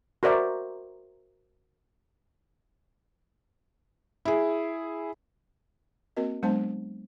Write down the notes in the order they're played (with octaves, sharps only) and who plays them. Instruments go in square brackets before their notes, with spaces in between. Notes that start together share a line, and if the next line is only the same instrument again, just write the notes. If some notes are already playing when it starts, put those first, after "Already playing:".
[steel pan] F#4 A#4 C5 D5 E5
[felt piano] E4 G#4
[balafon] A#3 C4 F#4 A#4 D#5
F#3 G#3 B3 D4 C5 A5